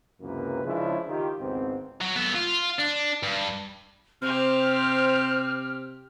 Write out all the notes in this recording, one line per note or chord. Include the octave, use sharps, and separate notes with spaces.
C#2 F#2 C3 E3 A#3 B4
C#3 F3 G#3 C#4 D4 E4
D#3 F4 G4
G#1 C#2 G#2 B3 C4
F#3
B3 A4
F4
D4
G2
C3 C4 G4 C5 F6